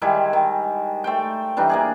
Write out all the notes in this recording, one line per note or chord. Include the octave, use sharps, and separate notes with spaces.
D#3 G3 G#3 E4
D#3
A3 C5 G5
E3 G3 D4 D#4
A#3 D4 G#4